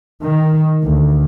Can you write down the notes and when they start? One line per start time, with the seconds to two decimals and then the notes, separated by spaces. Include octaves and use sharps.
0.23 D#3
0.83 D2